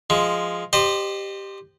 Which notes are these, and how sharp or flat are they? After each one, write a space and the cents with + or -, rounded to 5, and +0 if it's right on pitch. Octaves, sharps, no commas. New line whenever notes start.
F3 +0 G#3 +0
G4 +0 C5 +0 D#5 -35